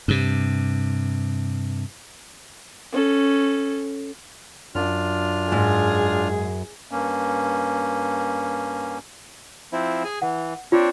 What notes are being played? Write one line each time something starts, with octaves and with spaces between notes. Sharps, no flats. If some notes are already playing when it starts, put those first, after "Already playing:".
G2 C3
C#4 A4
F#2 D4 F4 F6
G#2 G#4
G2 A#3 C#4
F3 C4 E4
G#4 G#5
E3 F#5
C4 D4 F4 C#5